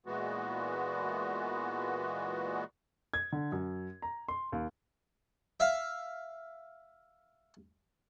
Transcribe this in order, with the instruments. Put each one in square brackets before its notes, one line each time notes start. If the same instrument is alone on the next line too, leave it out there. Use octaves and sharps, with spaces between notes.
[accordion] A#2 E3 G#3 B3 F#4
[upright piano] G#6
D3
F#2
A#5
C6
D#2
[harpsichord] E5 F5